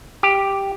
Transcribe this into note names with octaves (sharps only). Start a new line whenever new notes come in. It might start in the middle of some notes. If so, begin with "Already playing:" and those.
G4